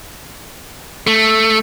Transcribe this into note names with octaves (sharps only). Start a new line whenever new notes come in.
A3